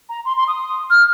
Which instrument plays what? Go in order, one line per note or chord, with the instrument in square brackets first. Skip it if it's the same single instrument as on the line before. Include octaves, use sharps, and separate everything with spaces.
[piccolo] A#5
C6
C6
D#6
F6